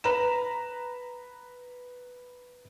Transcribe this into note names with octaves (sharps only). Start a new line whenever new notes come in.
B4 A#5 E7